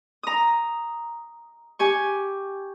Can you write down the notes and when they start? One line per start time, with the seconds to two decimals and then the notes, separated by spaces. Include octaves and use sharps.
0.23 A#5 D#6
1.79 G4 G#5 C#6